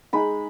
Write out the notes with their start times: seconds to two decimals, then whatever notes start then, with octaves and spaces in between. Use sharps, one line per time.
0.13 G#3 D#4 B5